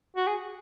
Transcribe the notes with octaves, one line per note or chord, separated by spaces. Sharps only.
F#4
G#4